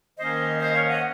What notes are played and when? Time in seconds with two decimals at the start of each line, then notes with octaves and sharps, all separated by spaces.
0.18 D#3 A#3 C#4 C5 D#5
0.60 C5 D#5
0.74 C#5 F5
0.88 D#5 F#5